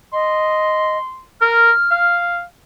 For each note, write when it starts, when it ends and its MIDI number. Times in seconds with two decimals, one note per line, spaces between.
0.13 0.98 75
0.13 1.23 84
1.41 1.71 70
1.41 2.20 89
1.91 2.43 77